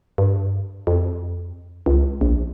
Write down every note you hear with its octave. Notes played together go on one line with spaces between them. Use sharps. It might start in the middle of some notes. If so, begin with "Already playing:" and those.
G2
F2
C#2
A#1